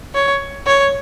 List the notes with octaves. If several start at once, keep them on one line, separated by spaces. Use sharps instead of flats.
C#5
C#5